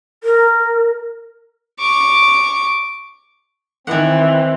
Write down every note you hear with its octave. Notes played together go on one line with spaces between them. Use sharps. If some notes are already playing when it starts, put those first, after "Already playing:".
A#4
C#6 D6
D#3 E3 C4 F#5